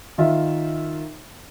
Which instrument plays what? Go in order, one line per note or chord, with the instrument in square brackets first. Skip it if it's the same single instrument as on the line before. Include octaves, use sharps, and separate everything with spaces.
[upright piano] D#3 F4 E5